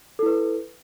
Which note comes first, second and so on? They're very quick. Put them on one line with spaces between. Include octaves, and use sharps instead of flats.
A4 E4 B4